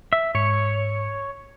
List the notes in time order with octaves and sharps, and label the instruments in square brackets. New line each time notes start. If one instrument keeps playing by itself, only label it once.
[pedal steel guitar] E5
[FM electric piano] G#2 C#7 [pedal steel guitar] C#5